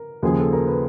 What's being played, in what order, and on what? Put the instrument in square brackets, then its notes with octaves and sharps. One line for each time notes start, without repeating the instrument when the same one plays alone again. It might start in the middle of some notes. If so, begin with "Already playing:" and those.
Already playing: [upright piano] A#4
D#2 C#3 F3 G#4
A4
A#4
B4